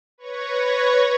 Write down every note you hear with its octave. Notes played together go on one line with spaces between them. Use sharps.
B4 C#5 C#6 G#6 A#6